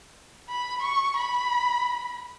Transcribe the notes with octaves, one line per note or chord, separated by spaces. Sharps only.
B5
C#6
B5